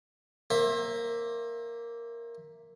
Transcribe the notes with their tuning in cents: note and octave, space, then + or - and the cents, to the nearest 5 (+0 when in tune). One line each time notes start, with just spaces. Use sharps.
A#3 +0 C5 +35 E5 +0